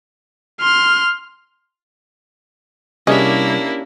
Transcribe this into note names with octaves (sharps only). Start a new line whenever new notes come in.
C6 F6
C2 A#3 C#4 D4 E4 G4 G#4 D#5